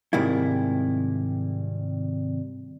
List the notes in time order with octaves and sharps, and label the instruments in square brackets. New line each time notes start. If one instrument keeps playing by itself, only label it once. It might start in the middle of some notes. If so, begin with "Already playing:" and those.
[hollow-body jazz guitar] G#2 C3 D#3 G3 E4